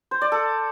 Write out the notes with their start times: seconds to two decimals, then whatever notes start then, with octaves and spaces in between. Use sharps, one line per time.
0.11 C5
0.21 D5
0.32 A4